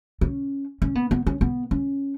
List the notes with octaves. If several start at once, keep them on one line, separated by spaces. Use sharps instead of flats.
C#4
C#4
B3
B3
C#4
B3
C#4